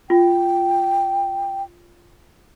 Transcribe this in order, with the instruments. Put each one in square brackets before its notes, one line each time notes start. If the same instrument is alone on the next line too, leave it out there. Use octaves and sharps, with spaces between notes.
[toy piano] F4 [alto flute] G5